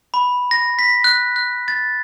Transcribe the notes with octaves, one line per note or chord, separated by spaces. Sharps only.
B5
A#6
B6
F#6
F#6
A6